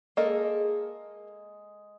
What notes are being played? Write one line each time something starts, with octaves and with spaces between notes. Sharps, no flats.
G#3 A#3 A4 D#5